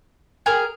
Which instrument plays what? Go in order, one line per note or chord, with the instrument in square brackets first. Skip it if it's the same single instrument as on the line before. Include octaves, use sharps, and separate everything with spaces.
[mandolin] G#4 A#4